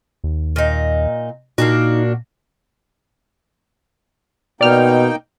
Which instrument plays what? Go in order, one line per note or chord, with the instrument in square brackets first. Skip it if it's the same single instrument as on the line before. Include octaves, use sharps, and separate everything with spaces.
[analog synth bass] D#2
[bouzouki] A#2 D#4
[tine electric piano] A#2 [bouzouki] A#3 D4 F#4 [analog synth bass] D#4
[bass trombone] B2 [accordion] A#3 D#4 G5 [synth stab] D5 F6